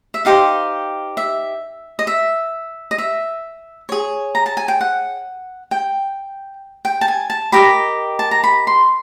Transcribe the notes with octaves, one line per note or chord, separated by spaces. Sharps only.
E5
D#4 G4 C5 F5
E5
D#5
E5
D#5
E5
G#4 C#5
A#5
A5
G#5
G5
F#5
G5
G5
A5
G#5
A5
G4 A#4 D#5 B5
A5
A#5
B5
C6